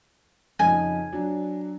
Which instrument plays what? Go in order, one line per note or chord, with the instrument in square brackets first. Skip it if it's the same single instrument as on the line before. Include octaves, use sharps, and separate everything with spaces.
[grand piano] F2 C#3 D#4 [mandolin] G#5
[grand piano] F#3 D4